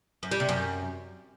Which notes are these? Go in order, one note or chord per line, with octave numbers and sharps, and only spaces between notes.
F#2
G3
C3
F#2